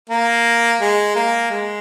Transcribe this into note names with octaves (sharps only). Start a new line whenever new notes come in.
A#3
G#3
A#3
G#3